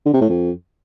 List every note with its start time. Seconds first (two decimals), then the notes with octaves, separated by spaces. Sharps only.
0.06 D3
0.14 C3
0.21 A2
0.29 F2